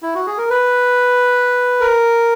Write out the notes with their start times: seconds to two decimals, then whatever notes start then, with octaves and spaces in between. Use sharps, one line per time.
0.03 E4
0.15 F#4
0.27 G#4
0.38 A#4
0.50 B4
1.81 A#4